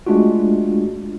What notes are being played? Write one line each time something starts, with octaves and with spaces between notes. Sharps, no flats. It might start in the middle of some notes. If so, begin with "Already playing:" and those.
G#3 A3 D4 F4 F#4